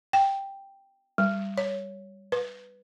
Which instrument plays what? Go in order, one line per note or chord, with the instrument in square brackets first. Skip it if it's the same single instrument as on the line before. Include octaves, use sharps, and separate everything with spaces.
[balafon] G5
G3
C#5
B4